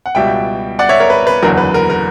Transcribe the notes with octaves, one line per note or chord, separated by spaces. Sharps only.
F#5
C#2 B2 G3 E5 G5
D5 F#5
C#5 E5
A#4 C#5
B4
B4
F#1 E2 D3 F#3 A#4
B4
A#4
A#4